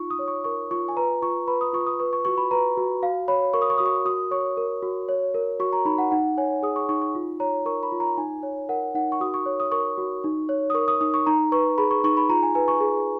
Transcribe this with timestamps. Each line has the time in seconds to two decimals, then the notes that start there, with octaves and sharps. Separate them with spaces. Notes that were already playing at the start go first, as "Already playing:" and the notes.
Already playing: D#4 F4 C#6
0.11 D#6
0.19 C#5
0.28 C#6
0.44 A#4 C#6
0.71 F4 C#6
0.88 G#5
0.97 B4 A#5
1.22 F4 C#6
1.47 B4 B5
1.61 D#6
1.73 F4 C#6
1.87 D#6
1.99 B4 C#6
2.13 C#6
2.25 F#4 C#6
2.38 B5
2.51 B4 A#5
2.77 F#4
3.02 F#4 F5
3.28 C#5 B5
3.53 A#4 C#6
3.62 D#6
3.70 C#6
3.78 F#4 D#6
3.86 C#6
4.05 F#4 D#6
4.31 C#5 C#6
4.57 A#4
4.83 F#4
5.09 C#5
5.34 A#4
5.60 F#4 C#6
5.73 A#5
5.85 D#4 B5
5.98 F#5
6.11 D#4 F#5
6.38 C#5 G#5
6.63 G#4 D#6
6.76 C#6
6.89 D#4 C#6
7.02 C#6
7.15 F4
7.40 C#5 A#5
7.66 A#4 C#6
7.83 B5
7.92 F4
8.00 A#5
8.18 D#4 G#5
8.43 C#5
8.69 A#4 F#5
8.95 D#4 F#5
9.12 C#6
9.21 F#4 D#6
9.34 C#6
9.46 C#5
9.60 D#6
9.72 A#4 C#6
9.98 F#4
10.24 D#4
10.49 C#5
10.70 D#6
10.74 A#4 C#6
10.88 D#6
11.01 D#4 D#6
11.14 C#6
11.26 D#4 A#5
11.52 B4 C#6
11.78 G#4 B5
11.91 C#6
12.04 D#4 C#6
12.17 B5
12.29 F4 A#5
12.43 G#5
12.55 B4 G#5
12.68 C#6
12.81 G#4